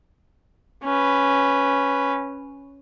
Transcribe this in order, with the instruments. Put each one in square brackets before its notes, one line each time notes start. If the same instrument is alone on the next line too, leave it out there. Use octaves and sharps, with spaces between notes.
[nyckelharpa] C#4 B4